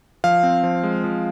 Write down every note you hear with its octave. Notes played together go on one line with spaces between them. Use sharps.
F3 F5
C4
F3
G#3
F3